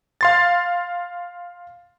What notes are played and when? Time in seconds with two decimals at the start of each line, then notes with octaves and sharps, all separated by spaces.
0.21 F5 C6 A6